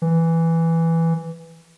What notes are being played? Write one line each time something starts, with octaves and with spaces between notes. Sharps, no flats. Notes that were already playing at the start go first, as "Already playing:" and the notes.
E3